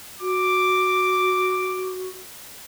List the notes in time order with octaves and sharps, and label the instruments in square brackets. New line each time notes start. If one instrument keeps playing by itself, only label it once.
[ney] F#4 [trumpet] D6